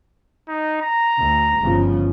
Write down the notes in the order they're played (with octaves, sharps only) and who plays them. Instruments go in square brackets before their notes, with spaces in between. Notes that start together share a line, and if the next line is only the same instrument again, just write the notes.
[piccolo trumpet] D#4
A#5
[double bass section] D2
G1 C#3 F3